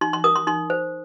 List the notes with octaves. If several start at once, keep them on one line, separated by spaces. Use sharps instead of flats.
D#4 C6
C6
A#4 D#6
C6
D#4 C6
C5